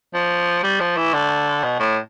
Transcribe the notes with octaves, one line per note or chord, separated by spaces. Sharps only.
F3
G3
F3
E3
D3
B2
A2